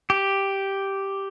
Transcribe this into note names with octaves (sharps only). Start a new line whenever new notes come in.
G4